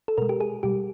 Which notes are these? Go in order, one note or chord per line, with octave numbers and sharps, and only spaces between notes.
A4
B2 G#3 A#4
G4
G#4
B2 G3 G4